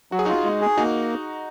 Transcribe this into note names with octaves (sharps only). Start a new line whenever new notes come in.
F#3 F#4
G#4
D#4 F4 F#4
G#3
G#4
A#3 D#4 F#4